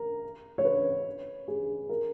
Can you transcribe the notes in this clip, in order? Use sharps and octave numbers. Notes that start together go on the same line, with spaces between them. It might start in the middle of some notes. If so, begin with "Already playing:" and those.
Already playing: A#4
C#5
B4
G#4
A#4